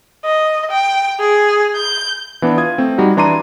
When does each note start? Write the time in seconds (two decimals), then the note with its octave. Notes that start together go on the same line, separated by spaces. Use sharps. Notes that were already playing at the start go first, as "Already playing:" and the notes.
0.25 D#5
0.70 G5
1.20 G#4
1.76 G6
2.42 E3 B3 D4
2.57 F4 D#6 G#6
2.78 A3 C4
2.98 G3 D#4 F#4
3.17 E3 D4 A#5 C6 D6 D#7